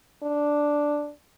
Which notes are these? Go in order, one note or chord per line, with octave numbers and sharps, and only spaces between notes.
D4